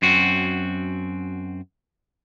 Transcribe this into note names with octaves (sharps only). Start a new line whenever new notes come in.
F#2 C4 F#4